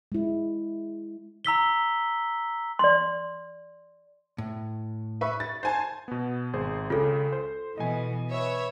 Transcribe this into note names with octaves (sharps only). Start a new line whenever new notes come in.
G#3 E4
A#5 E6 B6 G7
D5 C6
A2
B4 E5 C#6
A6
C5 G#5 A5
B2 B3
G#1 G#4 C5
C#2 C#3 F4 A4
C5
B2 E3 D#5 G#5
B4 C#5 E5